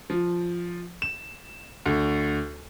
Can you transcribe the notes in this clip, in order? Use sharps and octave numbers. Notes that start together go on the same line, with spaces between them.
F3
E7
D2